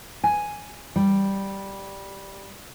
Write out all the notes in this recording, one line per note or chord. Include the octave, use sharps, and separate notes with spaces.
G#5
G3